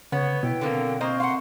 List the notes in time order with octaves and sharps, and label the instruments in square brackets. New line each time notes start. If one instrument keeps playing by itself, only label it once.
[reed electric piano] C#3 [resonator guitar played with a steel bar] B3 [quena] C#5
[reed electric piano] B2 [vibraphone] E4 B4 [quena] G5
[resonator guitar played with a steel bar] D3 F#3 A#3 [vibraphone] C4 A4 A#4
[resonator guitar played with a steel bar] A#3 C5 D#5 [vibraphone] C4 C#6
[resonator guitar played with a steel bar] F5 F#5 [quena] C6